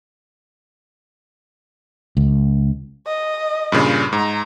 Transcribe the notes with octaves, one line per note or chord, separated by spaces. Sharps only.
C#2
D#5
G2 A#2 C#3
G#2 A#5